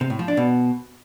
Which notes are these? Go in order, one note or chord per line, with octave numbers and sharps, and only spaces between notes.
C3
A2
F3
D4
B2